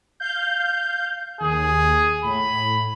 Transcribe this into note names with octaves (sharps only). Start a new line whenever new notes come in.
F5 G6
D#2 G#4
A2 B5